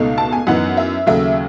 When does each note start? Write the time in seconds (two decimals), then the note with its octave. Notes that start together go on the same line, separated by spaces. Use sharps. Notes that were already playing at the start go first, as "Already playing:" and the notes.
Already playing: C#2 B2 A3 D#4
0.18 A5
0.32 G#5
0.47 F#2 E3 B3 D#4 F#5
0.77 E5
1.06 D#2 C#3 F#3 A3 E5